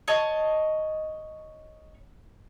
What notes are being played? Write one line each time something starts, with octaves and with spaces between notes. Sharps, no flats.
C#5 D#5 A5